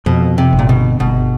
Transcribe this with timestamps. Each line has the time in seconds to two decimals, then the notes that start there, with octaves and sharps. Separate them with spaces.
0.06 F2 B2
0.38 C3
0.53 G1
0.59 A#2
0.69 B2
1.00 G1 B2